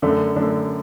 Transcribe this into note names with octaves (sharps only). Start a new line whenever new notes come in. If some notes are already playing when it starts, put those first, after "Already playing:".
F#2 D3 A3 D4
F#2 D3 A3 D4